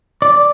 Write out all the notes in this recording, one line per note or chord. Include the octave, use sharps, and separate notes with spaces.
D5